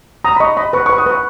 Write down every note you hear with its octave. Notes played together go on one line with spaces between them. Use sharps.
A#5 D#6
B5
D#5 C#6
D#5 B5
B4 C#6
C#6
B4
D#6
B4 C#6